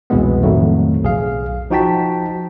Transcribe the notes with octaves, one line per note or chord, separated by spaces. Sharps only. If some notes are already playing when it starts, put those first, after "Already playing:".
C2 F2 B2 E3 G#3 B3
F2 A2 D#3 F#3 A3
B1 G#4 F5
F3 D#4 F#4 G5 A5 B6